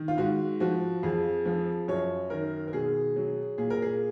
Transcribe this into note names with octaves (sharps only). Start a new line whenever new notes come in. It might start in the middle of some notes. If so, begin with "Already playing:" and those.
Already playing: D#3
F4
G#2 F#4
F3 F#4
F2 G#4
F3
F#2 C#5
D#3 A#4
A#4
B2 G#4
F#3
A#2 G#4
A#4
G#4